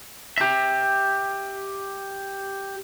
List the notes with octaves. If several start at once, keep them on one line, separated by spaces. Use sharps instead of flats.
G4 E5